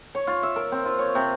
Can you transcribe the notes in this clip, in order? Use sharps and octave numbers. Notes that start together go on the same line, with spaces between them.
C#5
F4
E5
A#4
C4
F4
C#5
C3